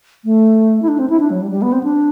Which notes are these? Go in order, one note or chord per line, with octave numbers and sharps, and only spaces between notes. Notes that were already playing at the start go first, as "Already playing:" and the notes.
A3
E4
D4
C4
E4
D4
F#3
G3
G3
B3
C4
D4